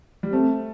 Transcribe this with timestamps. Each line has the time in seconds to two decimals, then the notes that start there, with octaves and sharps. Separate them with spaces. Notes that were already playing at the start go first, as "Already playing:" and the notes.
0.23 G3
0.32 A3 C4